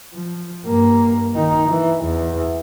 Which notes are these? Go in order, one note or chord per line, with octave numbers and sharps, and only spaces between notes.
F3
G2 A#3
D#3 D#4
E3
E2